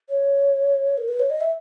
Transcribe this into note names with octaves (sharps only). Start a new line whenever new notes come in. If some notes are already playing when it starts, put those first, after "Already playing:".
C#5
A#4
B4
C#5
D#5
E5